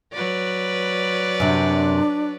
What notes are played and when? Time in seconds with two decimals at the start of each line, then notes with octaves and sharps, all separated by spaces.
0.13 F#3 B4 D5
1.40 F#2 C3 D4